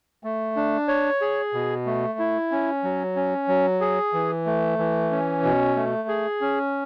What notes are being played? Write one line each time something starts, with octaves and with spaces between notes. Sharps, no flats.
A3
D4
C#5
G#4
B2
A3
E4
C#4
F#3
C#4
F#3
G#4
E3
A3
E3
C#4
B2
A3
G#4
C#4